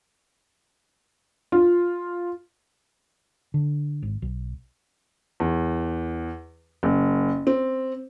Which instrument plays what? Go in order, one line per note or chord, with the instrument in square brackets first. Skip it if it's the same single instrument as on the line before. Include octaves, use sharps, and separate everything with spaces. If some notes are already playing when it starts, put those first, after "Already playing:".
[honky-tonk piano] F4
[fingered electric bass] D3
G#1
B1
[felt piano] E2
F#1
C4